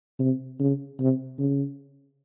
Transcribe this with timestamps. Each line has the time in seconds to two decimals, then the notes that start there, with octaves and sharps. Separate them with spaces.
0.19 C3
0.60 C#3
0.99 C3
1.39 C#3